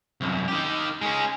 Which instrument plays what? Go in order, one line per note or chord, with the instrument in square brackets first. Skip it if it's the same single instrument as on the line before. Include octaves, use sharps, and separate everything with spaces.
[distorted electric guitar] C2 F#2
D#3 G4
G#3 C#4